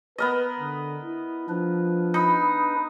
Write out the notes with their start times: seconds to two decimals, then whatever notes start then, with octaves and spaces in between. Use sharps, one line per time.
0.18 B3 A#4 B4 D#5
0.59 D3
1.04 E4
1.49 F3 D4 B4
2.14 D#4 B5 D#6